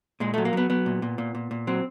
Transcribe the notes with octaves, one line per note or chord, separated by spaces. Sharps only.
A#2 G#3
F#3 A3
A#3
F#3 B3
F#3 B3
A#2
A#2
A#2
A#2
A#2
F#3 C4